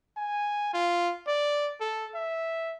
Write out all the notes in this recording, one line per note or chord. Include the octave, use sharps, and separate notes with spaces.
G#5
F4
D5
A4
E5